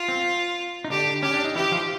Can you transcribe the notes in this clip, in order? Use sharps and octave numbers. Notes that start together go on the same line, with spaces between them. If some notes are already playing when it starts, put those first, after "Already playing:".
Already playing: F4
C4
D#4
D3 D4 G4
C#4 G4
D4
D#4
E3 E4 G4
F3 F4